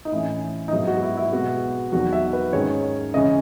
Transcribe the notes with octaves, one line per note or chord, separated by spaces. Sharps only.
D#4
A2 E3 A3 C#4 E4
D#4
G#2 F#3 B3 E4
F#4
F#4
E4
E4
B2 G#3 B3 F#4
E2 D#3 F#3 F#4
E5
B4
G#2 D#3 G#3 C#4 C#5
C#3 E3 G#3 C#4 D#5